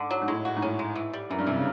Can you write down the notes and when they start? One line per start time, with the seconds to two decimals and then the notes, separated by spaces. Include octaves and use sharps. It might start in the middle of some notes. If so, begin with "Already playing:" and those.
Already playing: G#2 D3
0.11 F#3
0.21 G#2
0.28 A2 G#3
0.45 F#4
0.56 G#2
0.62 A2 C#4
0.79 G#3
0.96 E3
1.13 G3
1.30 F#2 E3
1.39 G2
1.47 C3 E3
1.56 C#3